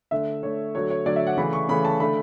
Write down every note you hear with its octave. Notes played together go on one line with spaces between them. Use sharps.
D3 A3 E5
D3 A3 C#5
D3 F#3 A3 C#5
C#5
D3 F#3 A3 D5
E5
F#5
C#3 E3 A3 B5
C#6
C#3 E3 A3 B5
A5
D3 A3 B5